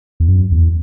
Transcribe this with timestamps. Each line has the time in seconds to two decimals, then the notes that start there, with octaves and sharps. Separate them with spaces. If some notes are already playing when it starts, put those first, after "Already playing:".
0.20 E2
0.28 F#2
0.52 E2